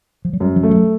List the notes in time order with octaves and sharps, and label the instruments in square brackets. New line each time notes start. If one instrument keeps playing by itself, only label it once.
[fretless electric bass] F3
F#3
[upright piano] F#2 [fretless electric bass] G3
[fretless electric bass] F3
[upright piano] A3
[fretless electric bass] F#3